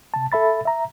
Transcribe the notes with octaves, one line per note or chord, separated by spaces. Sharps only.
C3 A5
A4 E5 B5 A6
E5 A#5